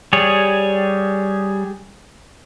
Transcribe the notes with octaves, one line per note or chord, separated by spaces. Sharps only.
G3 G#4 C#5